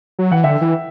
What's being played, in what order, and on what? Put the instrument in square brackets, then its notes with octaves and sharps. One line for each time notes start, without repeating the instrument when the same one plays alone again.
[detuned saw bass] F#3
[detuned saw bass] E3 [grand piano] F#5
[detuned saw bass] D3 [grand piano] E5 G5
[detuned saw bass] E3